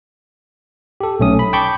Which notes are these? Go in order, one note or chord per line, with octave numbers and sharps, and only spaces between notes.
G4 A4
B1 A3 C#4 D#6
B5
G5 A5 B5 C#6 D6 G6